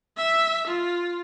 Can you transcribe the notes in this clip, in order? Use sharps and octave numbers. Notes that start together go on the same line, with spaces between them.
E5
F4